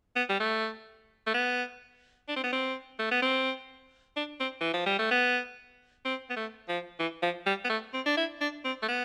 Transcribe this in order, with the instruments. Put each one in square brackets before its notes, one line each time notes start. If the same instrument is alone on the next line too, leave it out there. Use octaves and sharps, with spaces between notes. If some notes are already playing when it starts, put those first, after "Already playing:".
[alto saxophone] B3
G3
A3
A3
B3
D4
C4
B3
C4
A3
B3
C4
D4
C4
E3
F3
G3
A3
B3
C4
B3
A3
F3
E3
F3
G3
B3
A3
C4
D4
E4
D4
C4
A3
B3